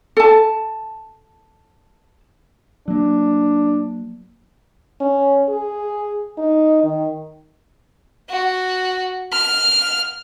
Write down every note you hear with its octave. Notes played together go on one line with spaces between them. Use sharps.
A4 A5
F#3 A#3 D4
C#4
G#4
D#4
D#3
F#4
F6